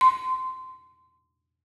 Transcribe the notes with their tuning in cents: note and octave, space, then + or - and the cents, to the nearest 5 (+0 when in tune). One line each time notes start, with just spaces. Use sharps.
C6 -20